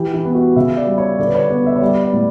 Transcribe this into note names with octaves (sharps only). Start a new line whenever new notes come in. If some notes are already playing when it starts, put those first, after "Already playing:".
Already playing: E3 G4
E4
B3
F#4
C#3 E5
D5
G3
C#5
D3 D5
B4
C#5
B3 D5
E5
C#5
G3 D5
D5
A2